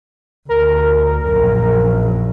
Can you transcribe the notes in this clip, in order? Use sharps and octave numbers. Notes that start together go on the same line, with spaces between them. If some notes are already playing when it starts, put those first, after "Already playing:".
D2 A#4
A#1 F#2